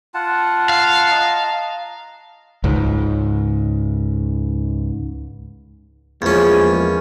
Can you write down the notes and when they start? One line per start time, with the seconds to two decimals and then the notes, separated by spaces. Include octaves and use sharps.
0.14 F4 F#5 A5
0.69 F5
1.11 D#5 A5 A#5
2.64 C#2 G#2
6.22 E2 F3 G#3 A#3 C#4